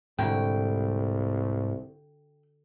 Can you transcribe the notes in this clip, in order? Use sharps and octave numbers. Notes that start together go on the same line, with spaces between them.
C2 G#2 D3 G3 F#4 G5